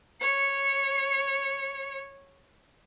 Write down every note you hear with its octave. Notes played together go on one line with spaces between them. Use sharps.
C#5 C#7